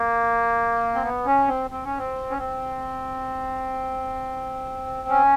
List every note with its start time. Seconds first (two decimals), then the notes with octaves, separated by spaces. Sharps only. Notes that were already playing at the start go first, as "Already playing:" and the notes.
Already playing: A#3
0.95 C4
1.03 B3
1.26 C#4
1.48 C4
1.71 C4
1.85 C#4
1.98 C4
2.30 C#4
2.38 C4
5.09 C#4